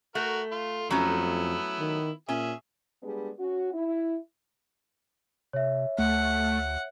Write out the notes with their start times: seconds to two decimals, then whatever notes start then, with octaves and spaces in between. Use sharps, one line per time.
0.15 A3 F#4 A#4
0.52 F4
0.90 F2 F#3 A3 B3 C#4 E4
1.79 D#3
2.28 A#2 C#4 G#4 E5
3.03 G3 G#3 B3 D4 G#4
3.39 C#4 F#4
3.74 E4
5.53 C3 C#5 E5
5.98 D2 A3 F#5